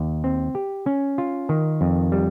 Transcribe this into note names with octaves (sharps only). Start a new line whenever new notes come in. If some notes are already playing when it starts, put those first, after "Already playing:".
Already playing: D#2
C4
G4
C#4
F4
D#3
F2
G3